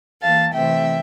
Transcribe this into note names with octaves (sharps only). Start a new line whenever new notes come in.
E3 A#3 F5 A5
C3 E3 A3 C4 E5 G5